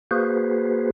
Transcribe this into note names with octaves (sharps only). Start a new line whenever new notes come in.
A#3 F#4 G#4 B4 C5